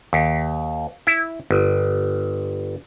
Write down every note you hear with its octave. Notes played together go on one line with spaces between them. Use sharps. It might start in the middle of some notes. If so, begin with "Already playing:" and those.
D#2
E4
G1